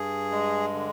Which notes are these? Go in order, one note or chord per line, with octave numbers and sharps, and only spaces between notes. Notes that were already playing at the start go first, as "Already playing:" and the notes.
Already playing: G2 G#4
G#3
D3